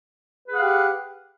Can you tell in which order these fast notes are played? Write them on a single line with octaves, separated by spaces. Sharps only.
B4 G#4 F#5 F5 G4